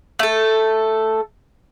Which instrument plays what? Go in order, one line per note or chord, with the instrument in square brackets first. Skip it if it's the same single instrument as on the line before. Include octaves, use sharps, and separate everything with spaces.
[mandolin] A3 A4